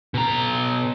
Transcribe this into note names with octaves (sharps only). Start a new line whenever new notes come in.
B2 A#5